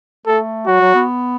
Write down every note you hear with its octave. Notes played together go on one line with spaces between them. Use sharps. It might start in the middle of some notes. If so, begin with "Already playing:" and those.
A3 A4
F#3 F#4
F#3
B3